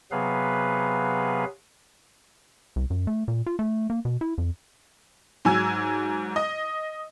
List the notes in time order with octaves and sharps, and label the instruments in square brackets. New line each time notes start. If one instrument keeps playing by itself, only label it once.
[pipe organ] C3 F#3 B3 G#4 B4 F5
[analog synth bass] C2
F#2
A3
A#2
F4
A3
A#3
B2
E4
F2
[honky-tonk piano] G#2 F#3 G#5 E6 G#6
D#5